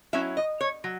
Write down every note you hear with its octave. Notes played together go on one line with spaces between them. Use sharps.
F#3 C#4 E4 E5
D#5
C#5
F#3